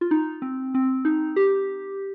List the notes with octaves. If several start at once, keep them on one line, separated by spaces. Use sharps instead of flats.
F4
D#4
C4
C4
D#4
G4